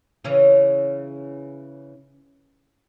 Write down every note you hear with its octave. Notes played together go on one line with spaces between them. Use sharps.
C#3 E3 C#4